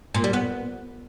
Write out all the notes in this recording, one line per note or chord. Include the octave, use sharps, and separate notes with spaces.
A#2
G3
B3